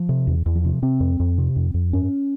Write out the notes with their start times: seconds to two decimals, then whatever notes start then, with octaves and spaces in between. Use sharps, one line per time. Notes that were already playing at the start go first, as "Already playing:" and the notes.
Already playing: F3
0.09 C3
0.27 E2
0.46 E2
0.55 F3
0.64 C3
0.82 C3 C4
1.00 F2
1.20 F2
1.38 C3
1.56 F2
1.74 F2
1.93 G2 C#4